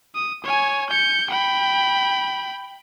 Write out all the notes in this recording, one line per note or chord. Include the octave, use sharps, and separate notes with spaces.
D#6
C#5 G#5
G6 C#7
G5 B5